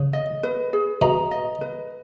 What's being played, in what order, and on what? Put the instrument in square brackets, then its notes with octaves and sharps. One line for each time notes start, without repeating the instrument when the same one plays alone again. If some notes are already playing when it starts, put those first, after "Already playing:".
Already playing: [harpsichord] C#3
[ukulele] D#5
B4
G#4
[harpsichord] B2 [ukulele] A#5
[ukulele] D#5
B4